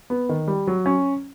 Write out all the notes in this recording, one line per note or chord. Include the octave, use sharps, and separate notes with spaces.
B3
D#3
G3
F#3
C#4